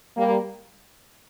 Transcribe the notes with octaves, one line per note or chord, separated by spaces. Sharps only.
G3 A#3